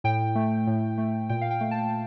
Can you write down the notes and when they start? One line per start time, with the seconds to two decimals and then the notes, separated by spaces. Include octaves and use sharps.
0.04 A2 G5
0.35 A3
0.67 A2
0.98 A3
1.29 A#2 G5
1.41 F5
1.51 G5
1.61 A3
1.71 A5